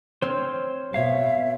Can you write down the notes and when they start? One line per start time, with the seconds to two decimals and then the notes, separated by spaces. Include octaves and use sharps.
0.22 C4 C5 C#5 F6
0.94 B2 C#5 E5 F5